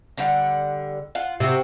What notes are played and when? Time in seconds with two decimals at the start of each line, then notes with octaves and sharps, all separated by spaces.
0.18 D3 G3 F#5
1.15 F4 F#5
1.40 C3 E4 F#4